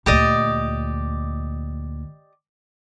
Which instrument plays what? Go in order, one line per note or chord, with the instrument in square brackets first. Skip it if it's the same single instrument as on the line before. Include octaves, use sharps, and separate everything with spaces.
[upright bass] D2 A#2 [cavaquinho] G4 D5 D#5